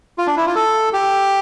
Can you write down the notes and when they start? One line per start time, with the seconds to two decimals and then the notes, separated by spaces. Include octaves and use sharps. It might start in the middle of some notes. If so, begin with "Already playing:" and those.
0.18 F4
0.27 D4
0.37 E4
0.46 F4
0.55 A4
0.93 G4